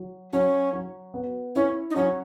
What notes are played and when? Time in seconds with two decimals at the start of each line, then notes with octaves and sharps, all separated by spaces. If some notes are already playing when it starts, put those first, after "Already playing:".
Already playing: F#3
0.33 F#3 C#4
0.73 F#3
1.14 B3
1.55 C#4 E4
1.90 D#4
1.96 F#3 C#4